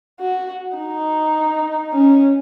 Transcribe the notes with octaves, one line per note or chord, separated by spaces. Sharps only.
F#4
D#4
C#4